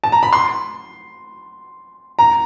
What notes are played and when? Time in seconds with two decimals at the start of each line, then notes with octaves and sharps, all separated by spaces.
0.04 A5
0.12 A#5
0.23 B5
0.33 C6
2.19 A#5